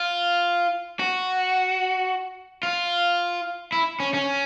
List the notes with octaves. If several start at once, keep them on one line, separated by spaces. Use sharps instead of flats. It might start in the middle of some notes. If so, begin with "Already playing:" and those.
Already playing: F4
F#4
F4
E4
C#4
C#4